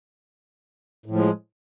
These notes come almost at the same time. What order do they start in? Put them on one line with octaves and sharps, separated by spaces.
A2 F3 G#3